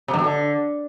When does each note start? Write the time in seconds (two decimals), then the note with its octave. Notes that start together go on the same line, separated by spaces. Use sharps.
0.08 C3
0.14 G2
0.19 B2
0.24 D3